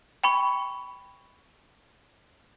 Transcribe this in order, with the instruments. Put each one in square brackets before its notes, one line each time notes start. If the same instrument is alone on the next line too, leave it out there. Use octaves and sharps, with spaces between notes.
[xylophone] G5 B5 C#6